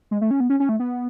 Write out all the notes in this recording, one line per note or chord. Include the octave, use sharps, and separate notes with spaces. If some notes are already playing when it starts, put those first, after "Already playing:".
G#3
A3
C#4
B3
C#4
C#4
A3
B3